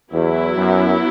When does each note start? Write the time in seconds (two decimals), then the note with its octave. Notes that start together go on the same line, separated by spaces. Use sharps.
0.12 E2 F#3 B3 E4
0.57 F#2